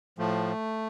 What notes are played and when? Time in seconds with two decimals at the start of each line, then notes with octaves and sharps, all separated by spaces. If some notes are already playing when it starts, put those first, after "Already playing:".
0.18 A2 F3 A3